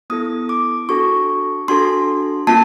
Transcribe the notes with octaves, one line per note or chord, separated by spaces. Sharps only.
B3 E4 A4 D#6
D6
D4 F#4 A4 C#6
D4 F#4 A4 C6
A#3 C#4 F4 A5